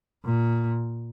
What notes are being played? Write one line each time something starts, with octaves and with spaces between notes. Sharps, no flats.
A#2